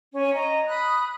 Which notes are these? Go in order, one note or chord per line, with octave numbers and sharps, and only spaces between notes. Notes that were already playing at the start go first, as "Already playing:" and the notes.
C#4
D#5 A#5
B5 D#6 F#6